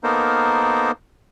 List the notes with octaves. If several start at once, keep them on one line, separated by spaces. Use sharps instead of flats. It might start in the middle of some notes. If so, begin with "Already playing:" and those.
A#3 B3 D#4 A4 A#4 C5